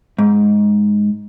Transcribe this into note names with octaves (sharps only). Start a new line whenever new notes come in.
G#2